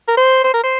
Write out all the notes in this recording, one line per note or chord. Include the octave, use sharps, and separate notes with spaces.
A#4
C5
C5
A#4
C5